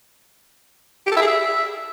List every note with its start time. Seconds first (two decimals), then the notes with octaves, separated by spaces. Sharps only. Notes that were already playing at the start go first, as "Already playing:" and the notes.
1.07 G4
1.12 A4
1.17 E5
1.22 G#4
1.27 E5